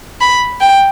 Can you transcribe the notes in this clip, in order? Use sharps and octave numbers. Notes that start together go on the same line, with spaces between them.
B5
G5